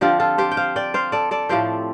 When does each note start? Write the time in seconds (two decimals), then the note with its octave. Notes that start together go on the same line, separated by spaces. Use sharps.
0.01 D3 F3 C4 F4 G4
0.20 F4 A4
0.38 G4 C5
0.51 G5
0.57 C5 F5
0.76 D5 G5
0.94 C5 F5
1.12 A4 D5
1.31 A4 D5
1.49 A2 F3 C4 G4 C5